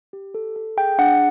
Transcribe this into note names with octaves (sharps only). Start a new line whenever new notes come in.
G4
A4
A4
G#4 G5
D4 F#5